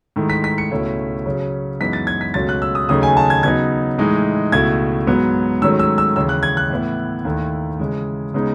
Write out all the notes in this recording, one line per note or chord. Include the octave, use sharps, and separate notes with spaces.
G#2 D#3 A3 E4
B6
B6
C#7
C#2 B2 A3 C#4 E4
C#3 F#3 C#4
F#2 E3 G#3 B3 D#4 B6
A6
G#6
B6
C#2 B2 F#3 A3 C#4 A6
F#6
E6
D#6
D#2 C#3 F#3 A3 D#4 D#6
G#5
A5
G#6
C#3 F#3 B3 D#4 G#6
A2 E3 G#3 D#4
C#2 B2 A3 E4 G#6
G#2 F#3 B3
G#2 D#3 F#3 A3 C#4 E6
E6
E6
D#2 C#3 E3 E6
F#6
G#6
F#6
A2 E3 B3 E4
D#2 D#3 A3 E4
C#3 E3 G#3
C#3 G#3 B3 D#4